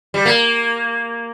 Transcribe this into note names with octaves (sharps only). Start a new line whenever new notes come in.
G3
A#3